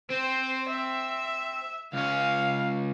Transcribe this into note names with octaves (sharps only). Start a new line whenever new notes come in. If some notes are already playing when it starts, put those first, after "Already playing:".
C4 C5
E5
C#2 C#4 F5